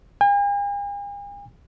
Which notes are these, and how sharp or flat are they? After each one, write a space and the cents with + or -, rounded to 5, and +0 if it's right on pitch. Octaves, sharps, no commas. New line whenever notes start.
G#5 -45